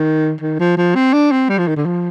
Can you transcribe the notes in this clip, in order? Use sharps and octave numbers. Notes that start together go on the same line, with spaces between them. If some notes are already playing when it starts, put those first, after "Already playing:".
Already playing: D#3
D#3
F3
F3
C4
D4
C4
G3
F3
D#3
D3
F3